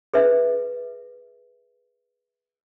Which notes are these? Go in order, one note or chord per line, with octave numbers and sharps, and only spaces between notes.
G#4 B4 E5